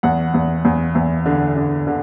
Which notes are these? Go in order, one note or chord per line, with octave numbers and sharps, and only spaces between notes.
E2 F#5
E2
E2
E2
D3
D3
D3